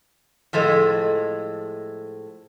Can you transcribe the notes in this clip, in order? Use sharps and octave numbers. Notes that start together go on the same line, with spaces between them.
A2 F3 G#3 A4 D#5